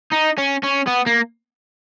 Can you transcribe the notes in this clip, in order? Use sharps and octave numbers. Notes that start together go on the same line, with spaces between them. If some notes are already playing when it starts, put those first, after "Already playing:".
D#4
C#4
C#4
B3
A#3